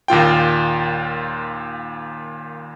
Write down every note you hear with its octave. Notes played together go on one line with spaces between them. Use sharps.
D#2 A#2 F4 G5